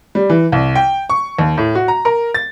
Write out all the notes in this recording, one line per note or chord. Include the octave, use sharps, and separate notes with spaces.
G3
E3
C2
G5
C#6
D#2
A2
F#4
A#5
A#4
A6